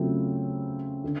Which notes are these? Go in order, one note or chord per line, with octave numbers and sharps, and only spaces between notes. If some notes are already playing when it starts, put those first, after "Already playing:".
Already playing: C#3 F#3 A3 C4 F4
D3